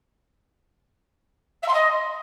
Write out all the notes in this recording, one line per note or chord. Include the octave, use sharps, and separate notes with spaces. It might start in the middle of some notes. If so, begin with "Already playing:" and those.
E5
C6
D#5